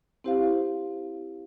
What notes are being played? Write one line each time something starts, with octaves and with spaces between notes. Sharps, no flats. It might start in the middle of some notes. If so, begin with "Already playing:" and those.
C4 E4 G4 C5 F5